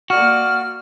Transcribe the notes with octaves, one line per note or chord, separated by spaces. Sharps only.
A#3 F#4 D5 F6